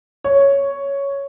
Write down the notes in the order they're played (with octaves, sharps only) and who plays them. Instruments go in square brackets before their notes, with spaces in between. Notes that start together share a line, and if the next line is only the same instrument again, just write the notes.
[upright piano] C#5